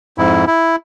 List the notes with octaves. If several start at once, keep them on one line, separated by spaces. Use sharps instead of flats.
F2 G#2 E4
E4